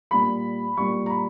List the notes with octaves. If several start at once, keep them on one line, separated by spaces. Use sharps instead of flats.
A#2 G3 B5
A#2 G3 C#6
A#5
B5